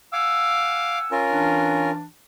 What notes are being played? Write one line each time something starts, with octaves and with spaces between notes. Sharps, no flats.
F5 F#5 G#5 D6 E6
C#4 F4 A#4
E3 D4